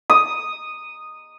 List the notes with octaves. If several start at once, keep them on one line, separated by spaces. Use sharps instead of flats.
D#6